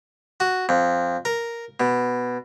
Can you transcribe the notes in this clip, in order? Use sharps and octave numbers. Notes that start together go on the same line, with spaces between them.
F#4
F2
A#4
B2